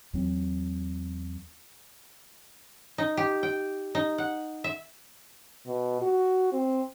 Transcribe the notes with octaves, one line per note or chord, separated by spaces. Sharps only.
E2 F#3 C4
D#4
G4
G5
D#4
F#5
E5
B2
F#4
C4